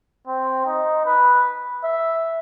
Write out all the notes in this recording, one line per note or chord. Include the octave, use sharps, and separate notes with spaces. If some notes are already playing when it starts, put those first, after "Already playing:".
C4
D#4
B4
E5